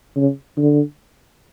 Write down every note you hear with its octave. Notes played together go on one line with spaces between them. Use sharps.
C#3
D3